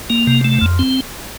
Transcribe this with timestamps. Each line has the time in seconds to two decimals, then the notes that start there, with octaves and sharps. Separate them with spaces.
0.10 A#3
0.27 C3
0.45 A3
0.61 F2
0.79 C4